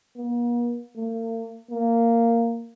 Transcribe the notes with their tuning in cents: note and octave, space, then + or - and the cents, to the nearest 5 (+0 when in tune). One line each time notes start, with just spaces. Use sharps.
A#3 +45
A#3 -45
A#3 -10